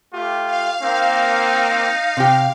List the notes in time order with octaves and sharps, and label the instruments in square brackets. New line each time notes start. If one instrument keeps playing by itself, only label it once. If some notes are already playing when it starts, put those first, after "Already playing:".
[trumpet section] A3 F4 G4
[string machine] F5
[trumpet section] A#3 C4 [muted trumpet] D#4
[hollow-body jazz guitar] C3 G4